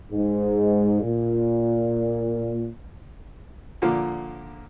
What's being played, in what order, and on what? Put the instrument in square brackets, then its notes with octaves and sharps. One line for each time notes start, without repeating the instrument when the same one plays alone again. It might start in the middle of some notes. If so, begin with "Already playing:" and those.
[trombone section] G#2
A#2
[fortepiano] A#2 D3 F3 A#3